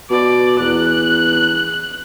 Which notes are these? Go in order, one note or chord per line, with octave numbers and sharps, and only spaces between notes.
B2 D5
E2 F#6